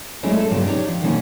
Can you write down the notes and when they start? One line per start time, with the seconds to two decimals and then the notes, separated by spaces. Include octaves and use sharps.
0.23 F#3 G#3 A3 C#4 D4 E4
0.36 A4
0.50 G2 A#2 C#3 F#3 B3 G4
0.65 D4 D#4 G4 A4 C#5
0.88 F3
1.01 B2 D#3 F3 G3 A#3 C#4